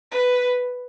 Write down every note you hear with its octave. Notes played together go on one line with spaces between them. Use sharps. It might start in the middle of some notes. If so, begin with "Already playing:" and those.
B4